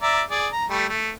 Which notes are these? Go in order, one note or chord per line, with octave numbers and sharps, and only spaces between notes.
D5 E5 A#5
G#4 D5
A#5
G3 A3
A3